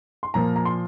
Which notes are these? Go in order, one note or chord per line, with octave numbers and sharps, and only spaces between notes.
C6
A#2 F3 A#3 A#5
A#5
C6